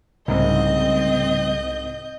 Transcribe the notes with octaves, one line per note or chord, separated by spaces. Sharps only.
C2 G#2 C#3 G3 A3 C4 D#5 G6